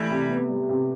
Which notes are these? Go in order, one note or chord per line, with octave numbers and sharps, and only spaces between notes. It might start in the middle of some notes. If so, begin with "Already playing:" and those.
Already playing: E3 G3 A3
C3
B3
G3
C3